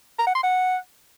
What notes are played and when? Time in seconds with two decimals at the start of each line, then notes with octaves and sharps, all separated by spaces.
0.19 A#5
0.27 F#5
0.35 C6
0.43 F#5